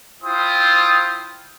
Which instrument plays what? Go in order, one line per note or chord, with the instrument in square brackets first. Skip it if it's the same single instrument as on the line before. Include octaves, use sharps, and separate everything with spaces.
[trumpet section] E4 F4 C5 G5 D#6